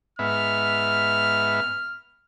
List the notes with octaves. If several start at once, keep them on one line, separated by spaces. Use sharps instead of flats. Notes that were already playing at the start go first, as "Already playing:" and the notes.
G#2 B3 E5 F6